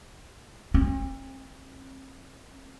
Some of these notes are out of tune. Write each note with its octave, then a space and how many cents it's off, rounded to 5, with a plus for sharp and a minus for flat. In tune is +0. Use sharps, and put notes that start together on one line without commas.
C4 +40